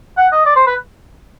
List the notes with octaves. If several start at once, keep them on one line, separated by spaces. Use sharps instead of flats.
F#5
D#5
D5
C5
B4